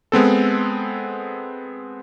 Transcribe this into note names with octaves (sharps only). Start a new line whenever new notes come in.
G#3 B3 C4 A4